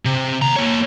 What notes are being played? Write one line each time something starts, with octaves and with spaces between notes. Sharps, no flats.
C3
D#2 A#5
A#3 C#5